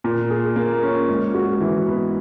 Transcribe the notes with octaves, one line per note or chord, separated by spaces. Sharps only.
A#2
G#4
A#3
C#4
G#2
F#4
E3
B3